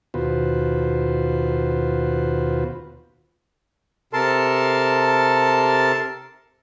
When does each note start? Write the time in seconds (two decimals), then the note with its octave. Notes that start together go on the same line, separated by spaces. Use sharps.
0.14 D#2 B2 F4 F#4 B4 C5
4.13 C3 A4 A#4 A5 C6